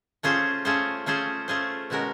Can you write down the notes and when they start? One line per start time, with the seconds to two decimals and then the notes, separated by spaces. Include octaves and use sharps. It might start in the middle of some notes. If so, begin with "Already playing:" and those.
0.23 A3 C#4 F4 G#4 C5
0.65 A3 C#4 F4 G#4 C5
1.06 A3 C#4 F4 G#4 C5
1.48 A3 C#4 F4 G#4 C5
1.90 B2 G#3 C#4 F#4 A#4